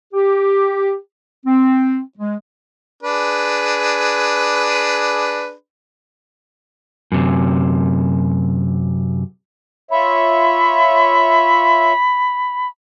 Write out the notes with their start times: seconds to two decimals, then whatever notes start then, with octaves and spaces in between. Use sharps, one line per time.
0.13 G4
1.46 C4
2.18 G#3
3.03 D4 G#4 B4
7.12 F#2 C3
9.91 F4 C#5 E5 B5